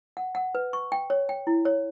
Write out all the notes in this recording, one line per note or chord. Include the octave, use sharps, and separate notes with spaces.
F#5
F#5
B4
C#6
G5
C#5
G5
E4
C#5